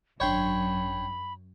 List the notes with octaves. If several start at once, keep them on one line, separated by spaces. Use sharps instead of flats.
G#1 F#2 D4 C#5 G5 B5 C6